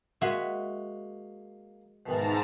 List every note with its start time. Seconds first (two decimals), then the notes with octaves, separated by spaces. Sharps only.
0.21 G#3 A#3 F#4 E5
2.06 G#2 B2 D#3 E3 A5 A#5